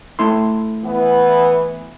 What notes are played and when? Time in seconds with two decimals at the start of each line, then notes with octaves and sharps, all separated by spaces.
0.19 A3 E4 C6
0.84 E3 B3